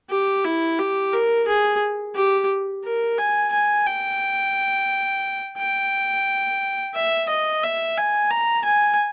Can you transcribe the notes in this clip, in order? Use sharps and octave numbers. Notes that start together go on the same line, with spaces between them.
G4
E4
G4
A#4
G#4
G4
A#4
G#5
G#5
G5
G5
E5
D#5
E5
G#5
A#5
G#5